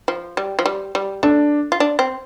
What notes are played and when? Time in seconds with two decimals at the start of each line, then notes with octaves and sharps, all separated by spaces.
0.08 F3
0.37 G3
0.59 F3
0.66 G3
0.95 G3
1.23 A3 D4
1.72 F4
1.80 D4
1.99 C4